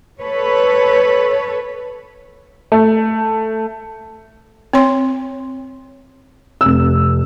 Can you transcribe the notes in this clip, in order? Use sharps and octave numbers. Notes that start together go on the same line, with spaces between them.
A4 B4 C#5
A3
C4 C#5 C6
F1 E6